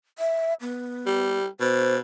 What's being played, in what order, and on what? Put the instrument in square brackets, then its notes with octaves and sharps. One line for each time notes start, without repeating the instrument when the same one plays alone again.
[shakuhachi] E5
B3
[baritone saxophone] G3
[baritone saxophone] B2 [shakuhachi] C5